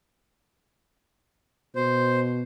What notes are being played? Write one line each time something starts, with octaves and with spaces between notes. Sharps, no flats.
B2 C5